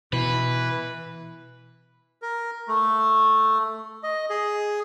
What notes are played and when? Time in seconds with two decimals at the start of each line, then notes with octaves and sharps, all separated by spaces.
0.13 B2 E3 B4
2.22 A#4
2.68 A3
4.03 D#5
4.30 G#4